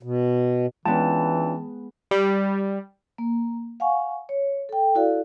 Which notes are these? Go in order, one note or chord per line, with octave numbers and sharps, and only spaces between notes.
B2
E3 G#3 B3 C#4 D4 F4 G5 A5
G3
A#3
F5 F#5 G#5 C#6
C#5
A4 G5
E4 F#4 A4 D5 F5